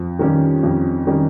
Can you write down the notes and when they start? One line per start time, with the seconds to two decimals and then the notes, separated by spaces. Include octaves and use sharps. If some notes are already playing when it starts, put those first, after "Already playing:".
Already playing: F2
0.19 D#3 G3 C#4 G4
0.63 F2
1.07 D#3 G3 C#4 G4